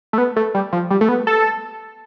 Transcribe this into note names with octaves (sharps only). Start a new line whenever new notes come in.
A3
B3
A3
G3
F3
G3
A3
B3
A4